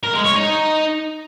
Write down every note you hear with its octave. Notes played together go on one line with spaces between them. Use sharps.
A#4
G#3
C#5
D#4